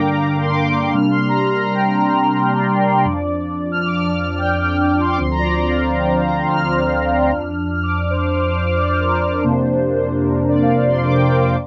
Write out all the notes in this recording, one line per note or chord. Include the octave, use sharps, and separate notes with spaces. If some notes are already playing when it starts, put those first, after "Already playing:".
Already playing: G2 D3 A#3 D4 F5 G5 A#5 D6
A#5
C6
D6
D6
C3 G3 A#3 D4 F6
C6
A#5
C6
G5
D5
F2 F3 D4
F6
D6
F6
D6
G5
G5
G5
C6
D6
D2 D3 F3 C4 C6
A#5
D5
C5
D5
F5
G5
A#5
C6
F6
F6
F2 F3 D4
F6
D6
C5
C5
C5
D5
C5
A#4
C5
F2 C3 A#3 D4
C5
A#4
D5
F5
C6
D6
G5
F5
F5